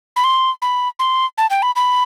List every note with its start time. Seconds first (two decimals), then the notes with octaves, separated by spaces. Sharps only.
0.16 B5
0.24 C6
0.62 B5
0.99 C6
1.38 A5
1.50 G5
1.62 B5
1.76 B5